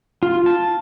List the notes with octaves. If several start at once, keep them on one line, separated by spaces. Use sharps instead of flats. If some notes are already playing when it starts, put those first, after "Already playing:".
F4
A5